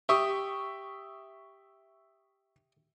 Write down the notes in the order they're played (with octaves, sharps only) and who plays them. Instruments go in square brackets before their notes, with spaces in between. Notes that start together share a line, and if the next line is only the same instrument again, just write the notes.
[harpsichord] G4 [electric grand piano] E5 C#6 D#6